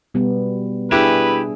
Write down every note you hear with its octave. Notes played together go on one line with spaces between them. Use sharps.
B2 G3 B3
D4 E4 G4 G#4 B4 E5